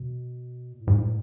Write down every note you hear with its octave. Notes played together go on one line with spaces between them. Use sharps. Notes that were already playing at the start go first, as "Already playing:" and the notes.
Already playing: B2
A#2
A2
G#2
A2